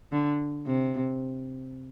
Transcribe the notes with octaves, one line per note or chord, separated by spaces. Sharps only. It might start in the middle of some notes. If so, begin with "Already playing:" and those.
D3
C3